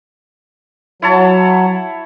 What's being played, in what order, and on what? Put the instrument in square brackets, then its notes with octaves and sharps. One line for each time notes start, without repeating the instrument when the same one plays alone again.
[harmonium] F#3 [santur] E4 C#5 A5